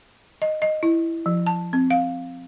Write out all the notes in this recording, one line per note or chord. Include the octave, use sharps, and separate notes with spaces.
D#5
D#5
E4
F3
A5
C4
F5